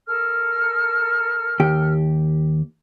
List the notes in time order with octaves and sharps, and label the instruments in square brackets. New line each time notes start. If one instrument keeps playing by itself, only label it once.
[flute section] A4 A#4 F6
[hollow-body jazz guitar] D#2 G4